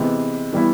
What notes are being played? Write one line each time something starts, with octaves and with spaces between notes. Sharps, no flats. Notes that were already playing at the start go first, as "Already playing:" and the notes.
Already playing: C3 E3 G#3 B3
E3 G3 B3 E4